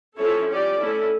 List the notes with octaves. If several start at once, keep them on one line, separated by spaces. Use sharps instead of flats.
F3 C#4 E4 A4 C#5
C#4 G4 D5
A3 C#4 E4 A4